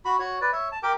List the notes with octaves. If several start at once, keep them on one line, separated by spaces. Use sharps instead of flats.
F#4 B5
F#4 C#5
B4 D5
C#5 E5
A5
G4 A#4 G5 D6